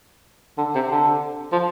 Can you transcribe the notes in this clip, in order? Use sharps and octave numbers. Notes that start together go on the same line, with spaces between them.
D3
C3
D3
F3